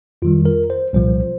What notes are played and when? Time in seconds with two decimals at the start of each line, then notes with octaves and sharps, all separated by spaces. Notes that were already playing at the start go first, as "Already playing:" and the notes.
0.22 F2 D#3 G3 F4
0.45 A#4
0.70 C5
0.93 C2 A#2 F3 C5